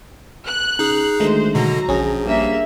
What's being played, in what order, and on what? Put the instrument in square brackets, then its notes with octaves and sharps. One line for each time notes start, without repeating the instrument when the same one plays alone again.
[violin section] F#6
[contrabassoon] C#3 [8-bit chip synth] D#4 G#4
[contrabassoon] D2 [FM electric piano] D#3 G#3 A3 [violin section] C5
[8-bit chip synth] B2 D3 [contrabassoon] F#3 [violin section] A#5
[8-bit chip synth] A#1 [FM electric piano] C#4 G#4
[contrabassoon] G2 [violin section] A#3 E5